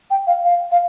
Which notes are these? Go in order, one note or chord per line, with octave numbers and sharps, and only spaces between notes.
G5
F5
F5
F5